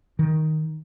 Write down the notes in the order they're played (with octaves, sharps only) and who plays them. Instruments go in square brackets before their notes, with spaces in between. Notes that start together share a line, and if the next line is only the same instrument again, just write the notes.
[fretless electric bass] D#3